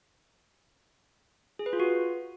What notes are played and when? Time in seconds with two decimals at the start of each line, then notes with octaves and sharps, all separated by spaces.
1.59 G#4
1.66 B4
1.73 F4
1.80 F#4